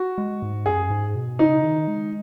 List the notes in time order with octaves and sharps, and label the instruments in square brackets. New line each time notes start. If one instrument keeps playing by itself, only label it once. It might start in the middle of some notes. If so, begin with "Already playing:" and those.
Already playing: [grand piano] F#4
[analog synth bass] G#3
G#2
[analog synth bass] F#2 [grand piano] G#4
[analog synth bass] G#2
B2
[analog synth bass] C#3 [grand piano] D#4
[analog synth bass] D#3
G#3